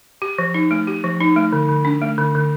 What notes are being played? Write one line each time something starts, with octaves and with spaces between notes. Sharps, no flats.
G4
F3
D#4
A3
G4
F3
D#4
A3
D3
D3
D4
A3
D3
D3